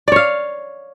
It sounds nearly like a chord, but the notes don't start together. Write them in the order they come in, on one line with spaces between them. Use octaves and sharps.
D5 C#5 F5